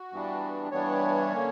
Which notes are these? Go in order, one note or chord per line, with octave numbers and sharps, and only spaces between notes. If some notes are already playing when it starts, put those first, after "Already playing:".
Already playing: F#4
G2 E3 G3 B3 D4
G2 E3 G3 B3 D4 C#5
D3 A#3 C#4